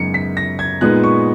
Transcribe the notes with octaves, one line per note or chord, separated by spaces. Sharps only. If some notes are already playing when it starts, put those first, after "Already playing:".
Already playing: F#2 C#3 G#3 B3 D#4 C#7
B6
A#6
G#6
A#2 G#3 B3 D#4 F#6
C#6